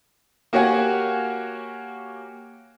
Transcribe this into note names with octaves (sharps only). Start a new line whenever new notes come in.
A#3 F#4 G4 C#5 F#5 G#5